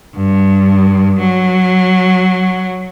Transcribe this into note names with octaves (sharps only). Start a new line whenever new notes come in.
G2
F#3